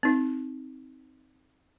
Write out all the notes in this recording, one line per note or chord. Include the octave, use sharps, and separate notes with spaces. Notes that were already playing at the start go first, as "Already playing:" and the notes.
C4 D#4